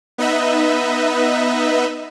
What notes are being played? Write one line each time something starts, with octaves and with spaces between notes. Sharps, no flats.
B3 D#4 B4 D#5 E5